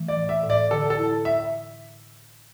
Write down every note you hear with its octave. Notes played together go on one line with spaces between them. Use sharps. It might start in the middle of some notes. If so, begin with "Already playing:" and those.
Already playing: E3 A3
D5
A2
E5
A2
D5
D3 A4
A4
E4
E5